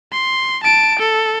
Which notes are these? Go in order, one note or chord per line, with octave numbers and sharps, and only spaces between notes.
C6
A5 D7
A4